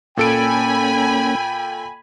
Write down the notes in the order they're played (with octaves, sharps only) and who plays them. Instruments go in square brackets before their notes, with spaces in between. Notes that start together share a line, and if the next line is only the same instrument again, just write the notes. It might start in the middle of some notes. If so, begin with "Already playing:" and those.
[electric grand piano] A#2 A4 D7 [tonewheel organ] A#3 C#4 [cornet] G5 [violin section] G#5 B5